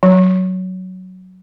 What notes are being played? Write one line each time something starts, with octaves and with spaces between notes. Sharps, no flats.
F#3